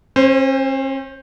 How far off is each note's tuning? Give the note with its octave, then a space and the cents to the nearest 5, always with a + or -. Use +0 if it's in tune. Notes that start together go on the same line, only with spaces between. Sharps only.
C#4 -45 C5 +0